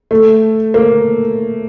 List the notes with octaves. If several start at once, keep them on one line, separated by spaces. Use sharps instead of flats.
A3
A#3